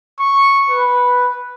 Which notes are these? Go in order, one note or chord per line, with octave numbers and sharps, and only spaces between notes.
C#6
B4